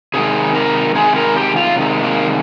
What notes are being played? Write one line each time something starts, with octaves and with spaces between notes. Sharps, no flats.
C3 D#3 G#3 G#4
A#4
C3 D#3 G#3 G#4
A#4
G4
F4
C3 D#3 G#3
A#3